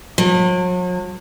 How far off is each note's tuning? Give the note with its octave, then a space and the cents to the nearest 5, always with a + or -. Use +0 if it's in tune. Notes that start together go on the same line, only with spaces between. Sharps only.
F#3 -45